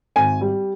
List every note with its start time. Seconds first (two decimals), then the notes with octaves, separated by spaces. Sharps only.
0.16 G#1 G#5
0.41 G3